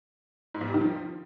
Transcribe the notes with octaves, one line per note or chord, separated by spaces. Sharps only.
G#2
E2
G3
D#3
F3